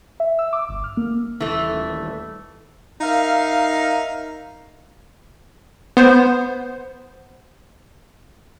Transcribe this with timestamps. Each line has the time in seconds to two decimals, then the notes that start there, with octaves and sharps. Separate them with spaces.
0.20 E5
0.39 E6
0.53 D6
0.69 G1
0.84 F6
0.97 A#3
1.40 D#1 E3 A3
3.01 D#4 A#4 E5 F5
5.97 B3 C5